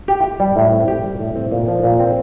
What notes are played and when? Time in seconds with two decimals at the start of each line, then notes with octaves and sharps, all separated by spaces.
0.08 G4
0.24 G4
0.40 G3
0.56 A2
0.72 C4
0.88 G4
1.04 G3
1.19 A2
1.36 C4
1.52 A#2
1.68 F3
1.83 A#2
1.99 C4